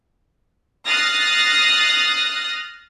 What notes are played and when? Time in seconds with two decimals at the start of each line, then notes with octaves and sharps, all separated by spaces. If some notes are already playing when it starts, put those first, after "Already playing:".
0.85 D#6 F6 F#6 A6 A#6 C7